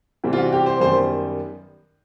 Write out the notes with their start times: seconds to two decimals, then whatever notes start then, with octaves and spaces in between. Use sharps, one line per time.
0.24 C3 E3 G3 C4
0.33 F4
0.38 F#4
0.53 G4
0.66 C5
0.81 F#2 D#3 G3 B3 C5